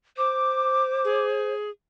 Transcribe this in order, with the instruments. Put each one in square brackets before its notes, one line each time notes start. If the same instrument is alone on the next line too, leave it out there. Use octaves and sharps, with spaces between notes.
[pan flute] C5 [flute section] D6
[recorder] G#4